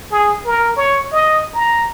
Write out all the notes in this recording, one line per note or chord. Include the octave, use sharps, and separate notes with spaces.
G#4
A#4
C#5
D#5
A#5